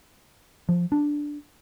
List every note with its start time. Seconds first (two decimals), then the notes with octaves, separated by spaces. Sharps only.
0.69 F3
0.92 D4